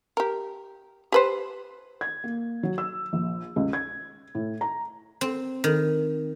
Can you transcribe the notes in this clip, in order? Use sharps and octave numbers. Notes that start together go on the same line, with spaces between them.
G4 A#4
G4 B4 C5
G#6
A#3
F#3
E6
A#1
C#2
G#6
A2
A#5
C4
D#3